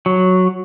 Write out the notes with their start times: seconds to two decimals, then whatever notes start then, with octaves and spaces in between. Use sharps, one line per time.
0.06 F#3